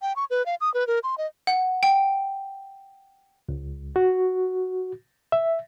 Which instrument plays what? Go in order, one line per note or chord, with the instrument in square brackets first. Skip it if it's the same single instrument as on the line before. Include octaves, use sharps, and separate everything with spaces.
[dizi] G5
C#6
B4
F5
D#6
B4
A#4
C6
D#5
[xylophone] F#5
G5
[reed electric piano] C#2
F#4
E5